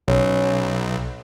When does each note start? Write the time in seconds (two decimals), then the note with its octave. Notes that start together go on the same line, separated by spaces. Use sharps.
0.08 B1 C#4